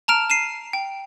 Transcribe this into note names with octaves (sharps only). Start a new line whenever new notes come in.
A5 A#5 F6 D7
C7 D#7 E7
G5